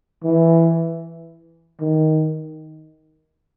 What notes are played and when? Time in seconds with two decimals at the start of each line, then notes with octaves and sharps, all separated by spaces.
0.24 E3
1.81 D#3